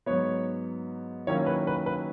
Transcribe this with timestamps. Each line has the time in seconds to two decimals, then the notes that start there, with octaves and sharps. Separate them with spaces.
0.06 G#2 F#3 B3 C#5
1.27 D#3 F#3 A#3 C#4 E4 C#5
1.46 B4
1.67 B4
1.86 B4